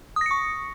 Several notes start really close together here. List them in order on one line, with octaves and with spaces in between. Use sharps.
D#6 A#6 C#7 C#6